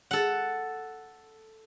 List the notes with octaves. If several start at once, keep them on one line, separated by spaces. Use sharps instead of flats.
A4 F#5